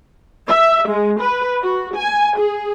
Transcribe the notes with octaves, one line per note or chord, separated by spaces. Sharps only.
E5
G#3
B4
F#4
G#5
G#4